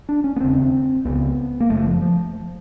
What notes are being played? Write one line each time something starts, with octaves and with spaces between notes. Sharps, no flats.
D4
C#4
B3
E1 D#2 C#3 C4
C#2 C#3 B3
A#3
F#1 F#2 C#3 A3
F3
F3